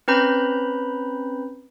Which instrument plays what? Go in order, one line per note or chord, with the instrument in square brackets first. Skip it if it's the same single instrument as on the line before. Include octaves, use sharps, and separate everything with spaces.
[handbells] C4 C#4 B4 A#5 B5 G6